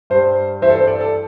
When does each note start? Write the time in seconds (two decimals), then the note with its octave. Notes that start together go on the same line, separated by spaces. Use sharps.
0.10 G2 G3 C5
0.62 G2 E3 G3 C5 E5
0.70 A4
0.75 C5
0.87 A4 D5
1.01 A4